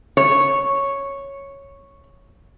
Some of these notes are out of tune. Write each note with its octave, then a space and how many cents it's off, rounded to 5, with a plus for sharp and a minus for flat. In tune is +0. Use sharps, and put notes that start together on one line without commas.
C#5 -5